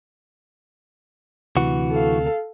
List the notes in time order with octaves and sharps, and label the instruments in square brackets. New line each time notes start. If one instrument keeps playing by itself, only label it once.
[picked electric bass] D2 C3 [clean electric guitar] E3 F#4
[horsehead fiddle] A4 F5